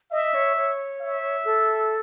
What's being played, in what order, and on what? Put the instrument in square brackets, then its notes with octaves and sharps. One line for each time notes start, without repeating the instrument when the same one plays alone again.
[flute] D#5 [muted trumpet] E5
[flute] C#5
C#5
[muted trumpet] E5
[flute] A4